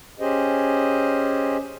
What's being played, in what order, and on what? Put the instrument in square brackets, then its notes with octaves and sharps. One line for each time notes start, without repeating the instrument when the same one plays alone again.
[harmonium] C#4 G4 G#4 C5 D#5